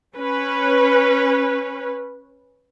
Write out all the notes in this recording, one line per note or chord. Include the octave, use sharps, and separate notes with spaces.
C#4 B4